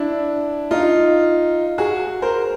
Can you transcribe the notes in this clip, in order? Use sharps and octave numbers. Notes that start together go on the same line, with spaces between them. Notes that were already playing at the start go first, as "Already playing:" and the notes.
Already playing: D4 E4
D#4 F4
F#4 G#4
A#4 C5